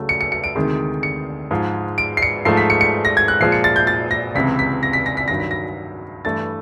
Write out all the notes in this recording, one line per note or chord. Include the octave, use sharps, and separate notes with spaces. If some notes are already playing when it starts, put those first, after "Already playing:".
Already playing: C#2 C#3 F#3 A3
C#7
C#7
C#7
D7
D2 C3 D#3 G#3
C#7
G#2 F3 G#3
D7
C7
C#7
G#2 F3 A3 C7
B6
C#7
C#7
A#6
G#6
F#6
A#2 F3 G#3 C7
C#7
A6
G6
A6
A#6
C#2 C3 E3 B6
B6
A#6
B6
A#6
B6
G2 D#3 F#3 A#6
B6
A#6
G2 E3 A3 A6